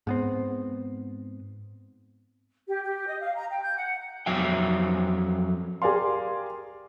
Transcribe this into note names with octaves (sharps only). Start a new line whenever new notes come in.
G#2 B3 C4
G4
G4
D#5
F5
A#5
G5
G6
F#5
F2 F#3 E5 G5
G4 G#4 A#4 D5 F5 C6